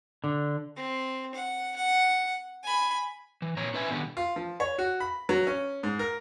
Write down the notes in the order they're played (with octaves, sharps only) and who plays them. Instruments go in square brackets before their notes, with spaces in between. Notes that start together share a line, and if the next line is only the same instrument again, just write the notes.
[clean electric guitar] D3
[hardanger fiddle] C4
F#5
F#5
G#5 B5
[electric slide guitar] E3
A#2 C#5 A#5
C#4 B4 D#5 E5 G#5
B2 D3 D#3 G3 B3
[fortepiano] F4
F3
C#5
F#4
B5
F#3
C#4
G#2
A#4